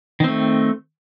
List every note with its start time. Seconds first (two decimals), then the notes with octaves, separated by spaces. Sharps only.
0.20 D#3
0.24 C4
0.28 A3